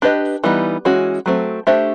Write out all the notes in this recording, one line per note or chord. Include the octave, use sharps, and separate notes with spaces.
D4 G4 B4 D#5
E3 G3 B3 D#4
E3 G#3 C#4 F#4
F#3 A3 C4
A3 D4 G4 C5 E5